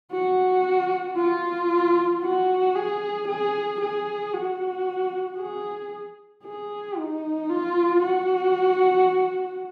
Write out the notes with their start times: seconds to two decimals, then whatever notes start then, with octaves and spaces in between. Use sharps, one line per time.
0.12 F#4
1.17 F4
2.22 F#4
2.75 G#4
3.28 G#4
3.81 G#4
4.34 F#4
5.38 G#4
6.44 G#4
6.97 D#4
7.49 F4
8.02 F#4